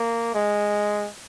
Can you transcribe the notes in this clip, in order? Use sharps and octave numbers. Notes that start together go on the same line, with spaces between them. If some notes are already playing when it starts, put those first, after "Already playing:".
Already playing: A#3
G#3